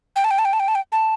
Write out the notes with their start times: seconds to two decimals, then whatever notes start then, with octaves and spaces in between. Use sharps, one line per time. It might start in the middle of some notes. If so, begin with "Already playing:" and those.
0.16 G5
0.24 A5
0.31 G5
0.39 A5
0.45 G5
0.53 A5
0.60 G5
0.68 A5
0.75 G5
0.92 A5